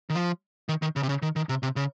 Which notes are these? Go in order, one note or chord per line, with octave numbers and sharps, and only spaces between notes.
D#3
F3
D#3
D#3
C#3
C3
C#3
D#3
D#3
C3
C3
C#3